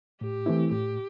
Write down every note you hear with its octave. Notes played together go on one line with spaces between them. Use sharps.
A2 G4
E3 A3 C4 E4
A2 G4